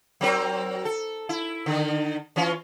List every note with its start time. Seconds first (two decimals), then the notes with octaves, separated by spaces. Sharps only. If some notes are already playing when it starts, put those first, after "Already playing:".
0.21 F#3 C4 A#4
0.85 A4
1.29 E4
1.66 D3 D#3
2.36 E3 C#4 F4